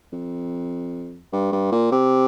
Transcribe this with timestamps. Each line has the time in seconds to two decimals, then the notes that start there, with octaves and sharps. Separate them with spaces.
0.13 F2
1.33 G2
1.52 G2
1.72 A#2
1.92 C3